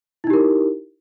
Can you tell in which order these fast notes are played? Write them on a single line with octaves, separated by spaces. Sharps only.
E4 D#4 G4 A#4